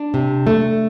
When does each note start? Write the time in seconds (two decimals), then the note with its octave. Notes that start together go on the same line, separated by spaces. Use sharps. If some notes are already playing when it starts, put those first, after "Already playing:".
Already playing: D4
0.14 C3
0.47 A3